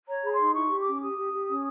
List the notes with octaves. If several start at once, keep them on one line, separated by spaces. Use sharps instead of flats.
C#5 A#5
G#4 B5
C6
D#4
E4 C#6
G4
D6
C#4
G4 D#6
G4
G4
C#4